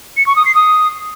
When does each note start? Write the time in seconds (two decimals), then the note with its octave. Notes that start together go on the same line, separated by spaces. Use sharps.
0.17 C#7
0.26 C#6
0.36 D#6
0.46 C7
0.55 D#6